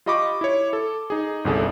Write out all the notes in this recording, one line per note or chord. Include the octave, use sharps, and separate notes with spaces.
F4 G4 D#5 B5 C#6 D6
E4 C#5
A4
D#4 G#4
G1 C2 G#4 A4